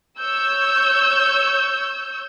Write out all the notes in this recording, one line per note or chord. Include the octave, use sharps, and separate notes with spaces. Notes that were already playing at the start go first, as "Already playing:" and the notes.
C#5 E6 G6